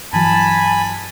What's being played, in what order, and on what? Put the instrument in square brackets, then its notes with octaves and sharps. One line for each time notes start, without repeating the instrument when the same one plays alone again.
[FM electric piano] G2 E3 F#3 [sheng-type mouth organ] G#5 B5 [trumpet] A5